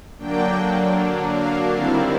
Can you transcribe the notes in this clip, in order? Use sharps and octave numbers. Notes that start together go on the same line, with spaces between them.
D3 F#3 A#3 D4 G5
F5
D#3 G3 C4 E4 F5